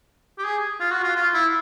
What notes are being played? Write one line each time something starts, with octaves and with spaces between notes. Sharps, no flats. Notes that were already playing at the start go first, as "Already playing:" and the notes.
G4
G#4
F4
F#4
F4
F4
E4